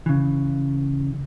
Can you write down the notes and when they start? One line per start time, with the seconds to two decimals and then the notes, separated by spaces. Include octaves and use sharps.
0.06 C#3 E3